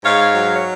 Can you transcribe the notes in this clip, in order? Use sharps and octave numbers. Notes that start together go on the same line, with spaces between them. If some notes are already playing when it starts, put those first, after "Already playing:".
G#2 C#5 F5
F#3
C#5